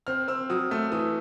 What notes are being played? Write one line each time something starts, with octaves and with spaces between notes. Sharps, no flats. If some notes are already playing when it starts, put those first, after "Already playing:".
C4 F6
C4 E6
F#3 D#6
A3 E6
E3 D#6